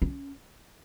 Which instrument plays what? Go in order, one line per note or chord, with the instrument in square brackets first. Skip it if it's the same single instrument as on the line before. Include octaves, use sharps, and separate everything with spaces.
[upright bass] C#4